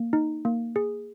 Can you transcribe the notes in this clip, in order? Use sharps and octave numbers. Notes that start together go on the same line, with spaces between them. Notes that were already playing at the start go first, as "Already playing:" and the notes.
Already playing: A#3
D#4
A#3
G#4